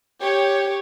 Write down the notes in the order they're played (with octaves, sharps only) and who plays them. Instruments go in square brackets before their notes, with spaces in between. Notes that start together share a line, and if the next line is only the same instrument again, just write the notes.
[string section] G4 C#5